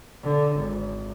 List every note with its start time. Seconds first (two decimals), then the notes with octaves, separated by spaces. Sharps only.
0.23 D3
0.56 G#1